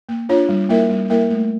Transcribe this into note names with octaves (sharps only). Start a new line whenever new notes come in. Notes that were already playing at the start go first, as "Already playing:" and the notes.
A#3
D4 F4 C#5
G3
A#3 E4 A#4 E5
G3
A#3 E4 A#4 E5
A3